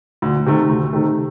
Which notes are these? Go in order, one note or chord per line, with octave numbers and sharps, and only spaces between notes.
D2
C3 D#3 A3
D2
C3 D#3 A3